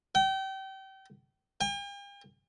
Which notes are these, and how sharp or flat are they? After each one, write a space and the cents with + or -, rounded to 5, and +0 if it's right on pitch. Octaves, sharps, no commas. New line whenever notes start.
G5 -30
G5 +45